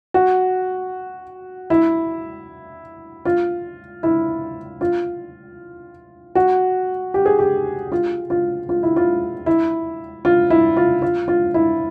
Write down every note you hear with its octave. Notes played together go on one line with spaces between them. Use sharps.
F#4
E4
F4
E4
F4
F#4
G4
G#4
G4
F4
F4
F4
E4
F4
E4
F4
E4
F4
F4
F4
E4